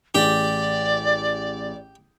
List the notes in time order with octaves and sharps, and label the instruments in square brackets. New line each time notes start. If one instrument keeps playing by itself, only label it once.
[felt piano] A1 G#4 [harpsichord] G4 [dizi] D5